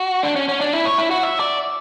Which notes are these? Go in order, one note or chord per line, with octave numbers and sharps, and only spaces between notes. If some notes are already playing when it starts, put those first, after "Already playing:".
Already playing: F#4
D4
C#4
C#4
D4
E4
C#5
E4
F#4
E5
D5